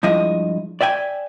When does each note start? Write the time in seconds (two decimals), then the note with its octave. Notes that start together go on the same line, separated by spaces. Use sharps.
0.03 G2 F3 G#3 E4 D#5 E5
0.81 D5 E5 G5 G#5